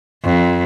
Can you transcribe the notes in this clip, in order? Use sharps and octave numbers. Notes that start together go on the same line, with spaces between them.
F2